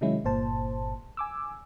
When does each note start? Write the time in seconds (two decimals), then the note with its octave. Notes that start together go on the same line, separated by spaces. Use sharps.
0.01 C3 D#3 F#3 G#3 C#4 E4
0.25 G1 A#2 C5 A5
1.17 G#5 D6 E6